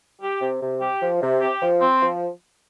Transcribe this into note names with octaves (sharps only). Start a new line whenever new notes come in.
G4
C3
C3
G4
F3
C3
G4
F3
C4
F3